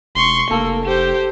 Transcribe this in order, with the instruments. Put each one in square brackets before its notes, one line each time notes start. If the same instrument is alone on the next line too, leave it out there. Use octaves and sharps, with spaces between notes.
[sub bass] E1 [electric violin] C6 C#6
[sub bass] F1 [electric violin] A#3 [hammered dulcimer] A4
[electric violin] G4 C5